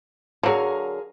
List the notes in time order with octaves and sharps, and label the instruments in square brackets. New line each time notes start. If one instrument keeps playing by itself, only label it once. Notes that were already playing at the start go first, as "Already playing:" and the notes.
[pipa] D3 F#3 [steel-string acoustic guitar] G#4 A#4 F5